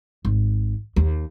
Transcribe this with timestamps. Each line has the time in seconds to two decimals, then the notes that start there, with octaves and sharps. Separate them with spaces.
0.25 G#1
0.96 D#2